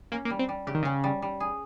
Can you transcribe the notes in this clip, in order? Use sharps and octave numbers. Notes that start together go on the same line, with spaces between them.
A#3 C#4
A#3
G3
C4
G3
C#3 G4
D#3
C#3 C#4
G3
G3
G#4